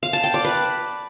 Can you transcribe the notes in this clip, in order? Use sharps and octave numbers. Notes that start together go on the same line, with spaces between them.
F5
A5
G5
D5
B4